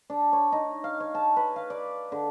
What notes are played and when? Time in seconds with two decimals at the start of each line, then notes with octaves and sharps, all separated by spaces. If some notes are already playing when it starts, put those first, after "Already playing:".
0.10 D4
0.33 C#5
0.52 D#4
0.84 F5
1.00 C#5
1.15 A5
1.37 B4
1.56 F5
1.70 D5
2.12 D3